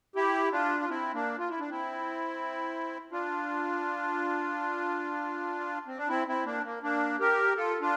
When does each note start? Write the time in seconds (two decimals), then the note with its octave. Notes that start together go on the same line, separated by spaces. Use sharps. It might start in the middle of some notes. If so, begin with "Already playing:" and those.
0.15 E4 G4
0.52 D4 F4
0.80 F4
0.89 C4 E4
1.13 A#3 D4
1.39 F4
1.49 E4
1.60 D4
1.70 C4 E4
3.12 D4 F4
5.87 C4
5.97 D4
6.08 C4 E4
6.28 C4 E4
6.45 A#3 D4
6.64 A#3
6.83 A#3 D4
7.20 G4 A#4
7.56 F4 A4
7.81 D4 F4